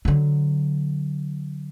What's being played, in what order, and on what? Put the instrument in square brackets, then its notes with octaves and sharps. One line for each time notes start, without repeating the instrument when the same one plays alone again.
[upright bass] D3 F#3